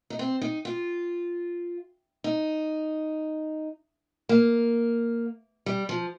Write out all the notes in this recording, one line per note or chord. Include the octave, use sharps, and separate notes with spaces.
D#4
C4
D#4
F4
D#4
A#3
G3
F3